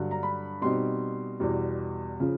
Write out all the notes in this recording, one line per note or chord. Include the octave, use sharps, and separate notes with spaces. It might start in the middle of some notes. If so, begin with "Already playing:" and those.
Already playing: G2 D3 F#3
A#5
B5
B2 G3 C4 D#4 C6
E2 B2 G3
C#3 F3